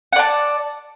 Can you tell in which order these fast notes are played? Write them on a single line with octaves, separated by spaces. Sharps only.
F#5 D5 A5